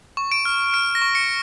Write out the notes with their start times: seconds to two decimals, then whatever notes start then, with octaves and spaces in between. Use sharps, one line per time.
0.17 C#6
0.32 D7
0.45 F6
0.73 F6 D7
0.95 A#6
1.02 C#6
1.15 C#7